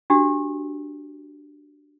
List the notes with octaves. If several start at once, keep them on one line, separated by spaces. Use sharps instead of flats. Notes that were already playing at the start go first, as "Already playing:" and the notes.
D4 F#4 G4